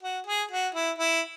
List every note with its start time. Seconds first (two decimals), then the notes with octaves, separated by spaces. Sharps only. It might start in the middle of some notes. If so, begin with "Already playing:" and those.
0.03 F#4
0.27 G#4
0.51 F#4
0.75 E4
0.98 E4